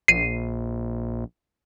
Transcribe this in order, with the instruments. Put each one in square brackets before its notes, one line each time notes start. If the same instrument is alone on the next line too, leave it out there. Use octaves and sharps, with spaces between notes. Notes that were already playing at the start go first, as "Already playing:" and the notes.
[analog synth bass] A#1 [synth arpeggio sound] C7 D#7